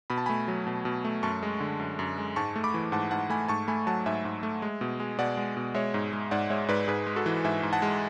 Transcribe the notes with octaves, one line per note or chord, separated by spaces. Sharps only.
B2 B5
A5
A3 G#5 B5
F#3
B2
B2
A3
F#2 A5 C#6
G#3
D3
F#2
F#2
G#3
G#2 A5 C#6
A3
B5 D6
E3
G#2 F#5 A5
G#2 F#5 A5
A3 G#5 B5
G#2 A5 C#6
A3 G#5 B5
F#3 F#5 A5
G#2 E5 G#5
G#2
A3
G#3
B2
G#3
B2 D5 F#5
G#3
B2
G#3 C#5 E5
G#2
G#3
G#2 D5 F#5
G#3 C#5 E5
G#2 B4 D5
G#2 G#4 B4
G#3
F#4 A4
E3
G#2 E5 G#5
G#2
F#5 A5
G#3